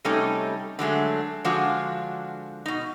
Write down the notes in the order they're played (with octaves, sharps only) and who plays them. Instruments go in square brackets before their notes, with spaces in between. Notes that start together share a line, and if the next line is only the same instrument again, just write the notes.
[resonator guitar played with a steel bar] C3 G3 A3 C#4 D#4 A4
D3 F#3 G#3 A3
D3 F3 G#3 D4 F4 F#4
B2 D#4